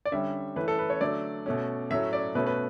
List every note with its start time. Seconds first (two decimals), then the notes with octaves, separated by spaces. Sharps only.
0.05 D5
0.12 D3 G3 C#4 E5
0.56 E3 A3 C#4 B4
0.68 A4
0.79 B4
0.90 C#5
1.01 D3 F#3 A3 D5
1.46 B2 A3 C#4
1.90 A2 F#3 A3 C#4 E5
2.13 D5
2.35 B2 A3 C#4 B4
2.47 B4